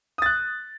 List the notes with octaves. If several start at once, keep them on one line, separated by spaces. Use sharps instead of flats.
D#6 F#6 A6